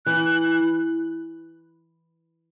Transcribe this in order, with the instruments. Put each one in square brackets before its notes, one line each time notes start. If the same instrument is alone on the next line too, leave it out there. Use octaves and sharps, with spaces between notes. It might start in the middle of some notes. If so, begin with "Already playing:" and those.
[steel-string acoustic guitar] E3 [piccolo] F#6